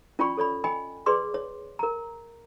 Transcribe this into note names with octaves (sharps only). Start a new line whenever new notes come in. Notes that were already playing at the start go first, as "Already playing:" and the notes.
C#4 F4 D5 G5 B5 C#6
A4 C#5 D5 B5
D#5 G5 G#5 B5
G#4 B4 D5 C6 D6
C#5
A#4 A#5